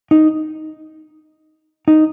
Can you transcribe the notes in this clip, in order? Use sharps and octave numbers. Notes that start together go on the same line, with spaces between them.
D#4
D#4